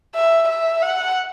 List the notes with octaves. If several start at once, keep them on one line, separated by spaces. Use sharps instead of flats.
E5
E5
F#5